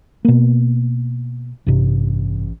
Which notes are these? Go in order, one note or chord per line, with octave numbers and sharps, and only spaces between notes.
B2 A#3
A1 G2 C3